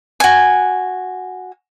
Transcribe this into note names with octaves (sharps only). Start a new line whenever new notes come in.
F#4 G#5